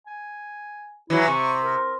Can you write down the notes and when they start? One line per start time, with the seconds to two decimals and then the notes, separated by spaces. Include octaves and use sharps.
0.07 G#5
1.10 E3 F#3 E4
1.28 C3 C#6
1.63 A#4